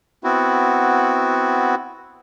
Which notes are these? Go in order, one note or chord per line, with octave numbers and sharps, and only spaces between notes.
B3 C4 E4 F#4